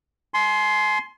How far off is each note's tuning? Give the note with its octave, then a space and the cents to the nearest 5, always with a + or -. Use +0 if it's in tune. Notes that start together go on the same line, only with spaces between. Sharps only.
G#5 +35 C6 +0